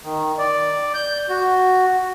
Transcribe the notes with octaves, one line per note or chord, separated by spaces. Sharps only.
D#3
D5
G6
F#4